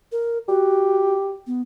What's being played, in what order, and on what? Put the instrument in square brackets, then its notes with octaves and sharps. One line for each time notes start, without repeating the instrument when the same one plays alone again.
[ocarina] A#4
[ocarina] F#4 [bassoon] G4
[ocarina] B3